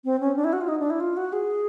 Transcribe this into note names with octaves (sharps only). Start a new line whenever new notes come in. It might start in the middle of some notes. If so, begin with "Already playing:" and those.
C4
C#4
D4
E4
F#4
F4
D#4
D4
E4
F4
F#4
G#4